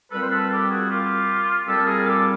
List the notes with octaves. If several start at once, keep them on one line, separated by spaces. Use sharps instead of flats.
A#2 G3 C4 A4 B4
C5
A4 B4
G4 A4
F#4 G#4
F4 G4
A#2 G3 C4 G4 A4
G#4 A#4
A#4
G4 A4
G4